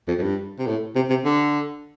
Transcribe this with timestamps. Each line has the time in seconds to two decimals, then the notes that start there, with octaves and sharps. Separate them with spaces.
0.08 F2
0.18 F2
0.22 G2
0.58 C3
0.66 A2
0.95 C3
1.10 C3
1.25 D3